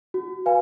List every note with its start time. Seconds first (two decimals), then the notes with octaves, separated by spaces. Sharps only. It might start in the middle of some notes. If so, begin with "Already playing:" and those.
0.14 F#4
0.46 B4 F5 G#5